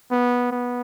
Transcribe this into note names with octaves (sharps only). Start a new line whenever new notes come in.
B3
B3